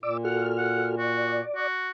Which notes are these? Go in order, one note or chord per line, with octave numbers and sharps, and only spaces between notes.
A#2 D5 D6 E6
F#4 A4 F#5 F6
F#5
F#4 D5
F#4